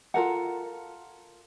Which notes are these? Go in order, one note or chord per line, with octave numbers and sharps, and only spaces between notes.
F4 A4 A#4 F#5